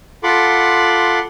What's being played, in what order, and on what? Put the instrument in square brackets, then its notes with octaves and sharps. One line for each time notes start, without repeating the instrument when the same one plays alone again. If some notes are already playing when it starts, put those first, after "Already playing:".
[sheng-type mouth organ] F4 A4 F#5 B5 C6 D6